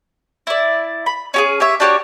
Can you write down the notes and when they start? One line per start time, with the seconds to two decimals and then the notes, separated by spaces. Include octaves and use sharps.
0.47 E4 D5
1.06 B5
1.34 C#4 G4 G#4
1.60 G4 C#5 E5
1.80 D4 F#4 G4 C#5